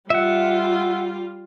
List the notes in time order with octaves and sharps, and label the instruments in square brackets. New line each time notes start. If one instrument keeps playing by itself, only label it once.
[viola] G3 F4 [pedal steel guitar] E5 F#5